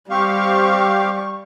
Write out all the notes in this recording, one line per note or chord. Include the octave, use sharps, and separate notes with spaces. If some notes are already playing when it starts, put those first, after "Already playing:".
G3 C4 G4 F5 C#6